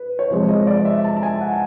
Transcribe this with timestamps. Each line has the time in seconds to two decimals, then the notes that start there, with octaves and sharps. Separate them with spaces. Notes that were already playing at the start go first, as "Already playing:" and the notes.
Already playing: B4
0.19 C#5
0.30 C3 F3 G#3 C5
0.49 D#5
0.67 D5
0.85 E5
1.04 A5
1.17 A5
1.23 G#5
1.41 F#5